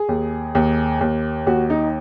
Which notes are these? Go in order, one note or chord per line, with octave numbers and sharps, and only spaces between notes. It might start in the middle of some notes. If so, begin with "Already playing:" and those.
Already playing: G#4
D#2
D#2
D#2
D#2 F#4
D#4